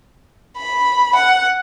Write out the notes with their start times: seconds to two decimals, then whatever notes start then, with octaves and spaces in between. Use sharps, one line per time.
0.56 B5
1.14 F#5